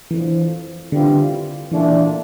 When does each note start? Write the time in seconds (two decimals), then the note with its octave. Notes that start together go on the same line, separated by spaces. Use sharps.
0.11 F2 D3 E3 F3
0.92 D3 E3 G3 C4 F4
1.71 A#2 E3 A3 D4